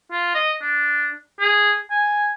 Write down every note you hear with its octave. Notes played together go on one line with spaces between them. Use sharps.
F4
D#5
D4
G#4
G#5